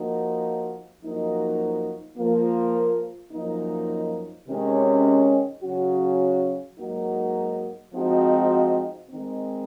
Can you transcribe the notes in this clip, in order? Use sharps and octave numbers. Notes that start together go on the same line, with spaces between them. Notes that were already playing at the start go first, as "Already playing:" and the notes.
Already playing: F3 A#3 D#4 F#4
F#2 F3 A#3 D#4 F#4
F3 A#3 F4
F#2 F3 A#3 D#4
C3 D#3 G#3 C#4
C#3 F#3 C#4 F#4
G#2 F#3 A#3 D#4 F#4
F3 G#3 C4 D#4 F#4
D#3 G#3 C4 D#4